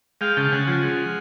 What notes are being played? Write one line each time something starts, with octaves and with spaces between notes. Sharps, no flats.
G#3 F5 G5
C#3 G5 A5
C#3 F#5 G#5
F3 F#5 G#5
G#3